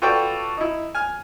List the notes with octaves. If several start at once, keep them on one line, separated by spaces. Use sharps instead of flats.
F4 F#4 A4 B4 D5 G5
D#4 E4
G#5 F6